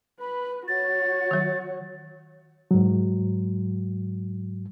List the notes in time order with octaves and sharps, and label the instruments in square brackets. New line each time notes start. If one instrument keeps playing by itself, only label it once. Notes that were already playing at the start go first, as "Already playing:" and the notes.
[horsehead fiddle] B4 [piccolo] B5
[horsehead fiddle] F#4 C#5 [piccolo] A6
[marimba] D#3 F#3
[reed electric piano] G#2 F#3